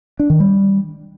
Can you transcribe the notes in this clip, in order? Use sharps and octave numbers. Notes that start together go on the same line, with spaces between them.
D4
D#3
G3